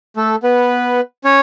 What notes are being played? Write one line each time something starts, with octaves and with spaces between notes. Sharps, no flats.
A3 A4
B3 B4
C#4 C#5